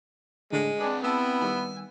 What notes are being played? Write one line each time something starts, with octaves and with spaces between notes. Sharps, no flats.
A2 D3 G#3 D4
C4 D4 G#4 B4
B3 C4 E4 A5 E6
D#3 G3 G#5 E6